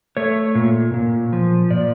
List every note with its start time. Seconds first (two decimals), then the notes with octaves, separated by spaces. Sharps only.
0.17 A3 C#5
0.55 A#2
0.94 A#2
1.33 F3
1.71 A#2 D5